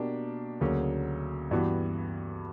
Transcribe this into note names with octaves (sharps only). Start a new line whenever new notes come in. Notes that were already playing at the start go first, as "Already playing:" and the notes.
Already playing: B2 A#3 D4 G4
D2 C#3 F#3 A#3 C#4
G2 E3 B3 F#4